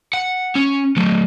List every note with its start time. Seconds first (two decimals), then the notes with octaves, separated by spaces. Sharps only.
0.13 F#5
0.55 C#4
0.97 F#3 A3